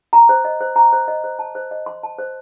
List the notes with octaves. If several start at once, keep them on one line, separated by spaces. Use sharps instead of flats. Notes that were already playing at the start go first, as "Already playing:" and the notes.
A#5
C5
D#5
C5
A#5
C5
D#5
C5
A5
C5
D#5
C6
A5
C5